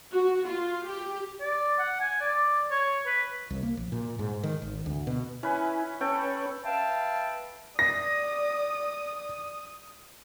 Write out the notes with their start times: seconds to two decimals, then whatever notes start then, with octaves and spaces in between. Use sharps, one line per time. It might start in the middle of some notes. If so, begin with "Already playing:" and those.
0.12 F#4
0.46 F4
0.85 G4
1.41 D5
1.79 F#5
2.01 G#5
2.21 D5
2.71 C#5
3.07 B4
3.50 C2
3.63 A#3
3.77 A#1
3.92 A#2
4.19 G#2
4.43 D#3
4.62 G#1
4.86 D2
5.07 B2
5.43 C#4 E4 B4 G#5
6.01 C#4 A4 B4 C#5 G5
6.64 B4 E5 F5 G5 A5
7.79 D5 D#6 A#6